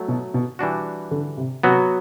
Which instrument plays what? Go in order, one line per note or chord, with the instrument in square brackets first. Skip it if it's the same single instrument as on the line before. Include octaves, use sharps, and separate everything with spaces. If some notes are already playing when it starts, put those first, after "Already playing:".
Already playing: [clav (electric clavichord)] F#3 A3
[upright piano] B2
B2
[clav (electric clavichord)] E3 G3 D4 F#4
[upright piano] D3
C3
[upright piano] C3 [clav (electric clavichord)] F#3 B3 F#4